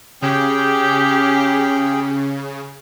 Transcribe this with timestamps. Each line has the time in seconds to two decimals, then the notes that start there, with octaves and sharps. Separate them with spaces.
0.22 C#3 C#4 G4 G#4 G5